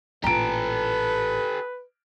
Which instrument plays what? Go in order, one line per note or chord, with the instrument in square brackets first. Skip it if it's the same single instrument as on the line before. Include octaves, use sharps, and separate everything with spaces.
[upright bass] A1 A#2 [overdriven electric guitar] G4 A4 [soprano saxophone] B4 [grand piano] A#5 D7